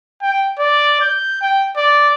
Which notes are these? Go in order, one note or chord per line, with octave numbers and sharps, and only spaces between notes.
G5
D5
G6
G5
D5